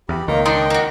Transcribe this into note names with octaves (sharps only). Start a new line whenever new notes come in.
E2 G4 B5
C#2 D#3 A#3 D#5 A#5
D4 D#4 D#5 G5 C6
A#3 F#4